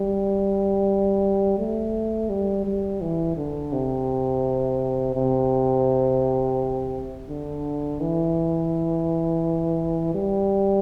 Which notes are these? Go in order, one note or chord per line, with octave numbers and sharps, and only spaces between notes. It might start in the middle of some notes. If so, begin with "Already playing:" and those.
Already playing: G3
A3
G3
G3
E3
D3
C3
C3
D3
E3
G3